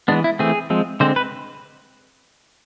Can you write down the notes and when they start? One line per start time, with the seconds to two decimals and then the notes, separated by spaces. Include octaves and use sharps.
0.08 E3 G#3 B3 D4
0.24 E4
0.39 E3 A3 C4 G#4
0.70 F3 G#3 C4
1.00 D3 G#3 C4 C5
1.16 B4